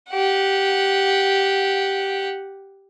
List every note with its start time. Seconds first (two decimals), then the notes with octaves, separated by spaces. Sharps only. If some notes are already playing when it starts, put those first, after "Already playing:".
0.10 G4 F#5